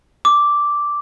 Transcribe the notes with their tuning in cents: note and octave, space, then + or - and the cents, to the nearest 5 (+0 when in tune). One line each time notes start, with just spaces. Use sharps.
D6 -5